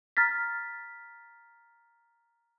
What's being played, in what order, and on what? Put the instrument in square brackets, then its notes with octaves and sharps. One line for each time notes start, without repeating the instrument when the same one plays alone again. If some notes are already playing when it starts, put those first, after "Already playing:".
[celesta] A#5 F6 A6 B6